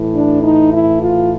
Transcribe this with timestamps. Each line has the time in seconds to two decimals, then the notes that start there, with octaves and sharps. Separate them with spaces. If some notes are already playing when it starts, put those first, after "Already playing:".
Already playing: A2 E3
0.15 D4
0.43 D#4
0.72 E4
1.00 F4